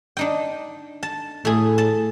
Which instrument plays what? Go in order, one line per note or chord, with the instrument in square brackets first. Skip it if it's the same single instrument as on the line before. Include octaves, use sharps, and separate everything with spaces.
[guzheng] D4 D#4 G5
A5
[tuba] A2 [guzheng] A3 G#4
[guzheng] A5